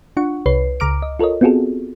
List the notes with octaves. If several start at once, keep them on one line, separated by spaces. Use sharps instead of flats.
D4 F4 F#5 C#6
C2 B4 C#5 C7
C#2 A#5 D6 F6 D7
D#5
F4 A4 A#4 C#5 D#5
B3 C4 F4 F#4 G#4 A4